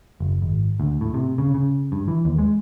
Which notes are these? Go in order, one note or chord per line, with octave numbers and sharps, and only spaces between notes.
F#1
G#1
D2
A2
C3
C#3
C#3
G2
E3
D#2
G#3